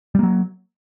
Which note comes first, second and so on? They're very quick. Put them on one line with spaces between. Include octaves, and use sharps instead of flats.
G3 A#3 F#3